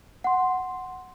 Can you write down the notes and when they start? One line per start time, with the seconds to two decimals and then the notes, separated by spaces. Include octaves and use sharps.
0.24 F#5 C6